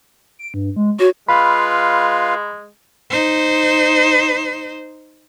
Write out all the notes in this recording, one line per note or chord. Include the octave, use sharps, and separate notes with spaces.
D7
G2
G#3
F#4 C#5
G#3 F4 B4 F5 B5
D#4 C5